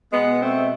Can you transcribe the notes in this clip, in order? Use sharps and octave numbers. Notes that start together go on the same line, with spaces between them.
B2 G#3 B3
A3 C4